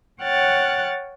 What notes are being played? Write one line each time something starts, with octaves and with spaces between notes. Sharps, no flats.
C#5 F#5 G5 F6 F#6 A6